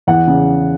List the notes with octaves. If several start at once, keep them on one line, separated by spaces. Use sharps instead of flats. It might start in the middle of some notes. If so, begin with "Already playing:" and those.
E2 F#5
C#3